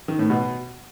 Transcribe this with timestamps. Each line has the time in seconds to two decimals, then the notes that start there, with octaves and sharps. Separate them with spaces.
0.08 D#3
0.19 A2
0.30 B2